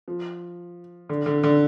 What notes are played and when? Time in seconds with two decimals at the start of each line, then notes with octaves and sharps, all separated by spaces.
0.08 F3
1.09 D3
1.26 D3
1.44 D3